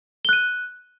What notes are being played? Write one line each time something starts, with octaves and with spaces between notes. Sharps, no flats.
F#6 D#7 G7